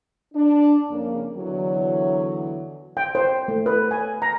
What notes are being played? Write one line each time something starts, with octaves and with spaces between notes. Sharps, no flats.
D4
F2 C#3 A#3
E2 D3 E3 F#3
G5
C5
A3
B4
G#5
A#5